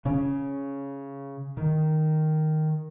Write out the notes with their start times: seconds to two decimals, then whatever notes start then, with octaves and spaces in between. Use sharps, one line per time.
0.05 C#3 C#4
1.57 D#3